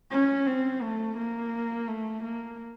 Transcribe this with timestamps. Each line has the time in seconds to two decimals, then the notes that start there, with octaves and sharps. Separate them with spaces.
0.12 C#4
0.47 C4
0.82 A3
1.18 A#3
1.88 A3
2.24 A#3